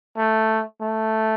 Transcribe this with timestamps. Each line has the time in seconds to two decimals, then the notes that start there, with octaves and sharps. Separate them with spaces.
0.17 A3
0.81 A3